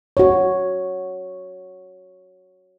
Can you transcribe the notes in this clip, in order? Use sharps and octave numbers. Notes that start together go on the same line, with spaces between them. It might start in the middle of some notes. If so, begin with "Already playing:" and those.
F#4 C#5